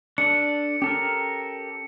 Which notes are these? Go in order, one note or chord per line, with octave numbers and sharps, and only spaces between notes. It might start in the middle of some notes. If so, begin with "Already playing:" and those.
D4 A4 D5 C#7
C#4 G4 A4 A#4